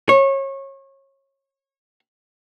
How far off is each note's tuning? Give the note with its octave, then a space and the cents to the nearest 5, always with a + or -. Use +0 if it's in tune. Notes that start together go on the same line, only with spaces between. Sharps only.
C#5 -25